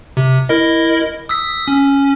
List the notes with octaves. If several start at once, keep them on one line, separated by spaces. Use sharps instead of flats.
C3
E4 A#4 D#5
D#6 E6 B6
C#4